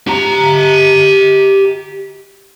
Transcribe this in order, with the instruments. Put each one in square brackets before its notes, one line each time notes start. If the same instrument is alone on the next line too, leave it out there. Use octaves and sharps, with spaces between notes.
[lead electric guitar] G4 A#5